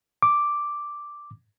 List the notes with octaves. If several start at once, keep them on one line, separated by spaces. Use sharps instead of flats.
D6